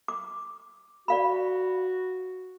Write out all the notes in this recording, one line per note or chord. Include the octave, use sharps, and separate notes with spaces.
D6
F#4 D5 F5 B5